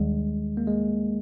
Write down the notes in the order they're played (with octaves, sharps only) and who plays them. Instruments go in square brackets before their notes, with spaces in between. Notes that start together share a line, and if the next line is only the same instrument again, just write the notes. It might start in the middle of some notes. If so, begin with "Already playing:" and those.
Already playing: [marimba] D#2 D#3 G3 [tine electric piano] G#3
[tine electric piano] A#3
G#3